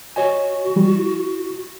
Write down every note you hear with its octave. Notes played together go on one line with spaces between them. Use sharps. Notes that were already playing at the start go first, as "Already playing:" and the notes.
F#4 C#5 D#5 G#5
F3 G3
E4